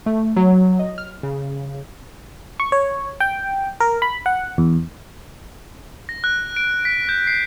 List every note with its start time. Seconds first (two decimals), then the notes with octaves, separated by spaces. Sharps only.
0.06 A3
0.36 F#3
0.79 D#5
0.98 F6
1.23 C#3
2.60 C#6
2.72 C#5
3.20 G5
3.80 A#4
4.02 B5
4.26 F#5
4.58 E2
6.09 A#6
6.24 F#6
6.56 D7
6.85 B6
7.09 G6
7.27 C7